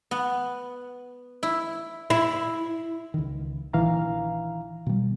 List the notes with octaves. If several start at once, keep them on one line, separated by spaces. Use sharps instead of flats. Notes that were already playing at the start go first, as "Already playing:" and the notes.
B3
E4
E4
C#2 D#3
A#1 D#3 E3 F5 A#5
B2 D#3 G3